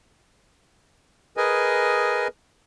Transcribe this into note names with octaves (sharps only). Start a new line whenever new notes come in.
G#4 A#4 B4 D#5 G#5